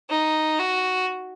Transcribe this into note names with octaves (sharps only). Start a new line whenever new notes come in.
D#4
F#4